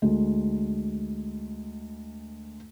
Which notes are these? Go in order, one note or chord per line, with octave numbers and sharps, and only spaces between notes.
D2 G#3